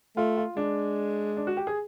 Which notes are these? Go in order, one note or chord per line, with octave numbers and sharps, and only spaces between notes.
A3 F4
F4
G#3 D4
D4
F#4
G4
G#4